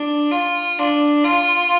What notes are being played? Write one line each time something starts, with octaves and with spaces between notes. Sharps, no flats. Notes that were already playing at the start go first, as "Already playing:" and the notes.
Already playing: D4
F4
D4
F4